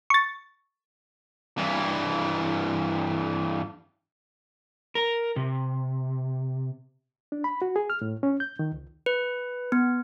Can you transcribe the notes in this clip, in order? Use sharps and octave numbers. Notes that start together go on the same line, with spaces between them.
C#6 A6
G2 E3
A#4
C3
D4
B5
F#4
G#4
F6
A2
C#4
G6
D#3
C#2
B4
B3